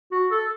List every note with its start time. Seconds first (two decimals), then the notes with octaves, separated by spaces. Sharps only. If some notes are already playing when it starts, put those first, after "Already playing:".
0.11 F#4
0.31 A4